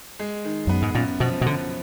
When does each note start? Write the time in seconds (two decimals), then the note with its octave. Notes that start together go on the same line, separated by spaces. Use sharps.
0.19 G#3
0.45 D#3
0.67 F#2 B3
0.82 G#2
0.95 F#2 A#2
1.20 B2 F3
1.41 B2
1.46 F#2 D3